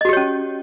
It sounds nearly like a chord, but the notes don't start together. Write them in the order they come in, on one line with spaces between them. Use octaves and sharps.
D#5 F#4 G4 C#5 C#4